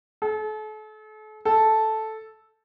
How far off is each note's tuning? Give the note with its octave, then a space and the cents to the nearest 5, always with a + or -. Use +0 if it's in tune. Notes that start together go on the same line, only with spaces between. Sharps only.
A4 -40
A4 -5